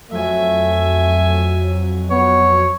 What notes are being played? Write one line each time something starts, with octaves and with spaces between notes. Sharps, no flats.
F2 F#3 A3 E5 G#5
B3 C#5